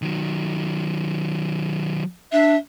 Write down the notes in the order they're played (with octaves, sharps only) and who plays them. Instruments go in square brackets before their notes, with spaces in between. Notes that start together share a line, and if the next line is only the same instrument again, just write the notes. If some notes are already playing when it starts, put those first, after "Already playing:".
[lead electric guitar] D#3 F#3
[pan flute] D4 [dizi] E5